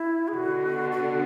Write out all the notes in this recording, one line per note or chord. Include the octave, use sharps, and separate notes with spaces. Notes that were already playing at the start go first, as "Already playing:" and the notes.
Already playing: E4
G#4
B2 D3 F#4
F#4